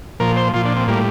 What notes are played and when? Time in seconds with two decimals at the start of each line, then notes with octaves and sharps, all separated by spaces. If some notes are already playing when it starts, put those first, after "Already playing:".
0.20 A#2 F3 A#4
0.37 C5
0.54 A#2 F3 F4
0.65 D4
0.76 C4
0.87 A2 G3 A#3